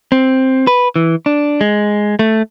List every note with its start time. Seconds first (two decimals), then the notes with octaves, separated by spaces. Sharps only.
0.12 C4
0.67 B4
0.96 E3
1.26 D4
1.61 G#3
2.19 A3